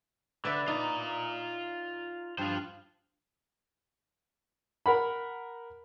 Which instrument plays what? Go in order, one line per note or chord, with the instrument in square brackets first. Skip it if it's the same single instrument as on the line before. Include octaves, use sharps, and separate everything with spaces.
[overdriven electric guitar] D3 [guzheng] B4 D5 E5
[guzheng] D#4 [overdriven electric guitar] F4 A#5
[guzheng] G2 [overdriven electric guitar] F4 C5
[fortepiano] A#4 F#5 B5